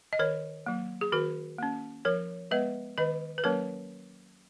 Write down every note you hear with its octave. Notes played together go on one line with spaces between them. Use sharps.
D#5
D#3 A#4 C#5
F#3 A#3
G#4
D#3 F#4 A#4
A#3 C#4
F3 A#4 C#5
G#3 B3 B4 D#5
D#3 B4 D#5
B4
F#3 A#3 C#4 A#4 C#5